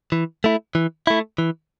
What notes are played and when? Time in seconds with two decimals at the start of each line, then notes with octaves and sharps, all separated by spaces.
0.12 E3
0.44 A3 E4
0.75 E3
1.07 A3 E4
1.38 E3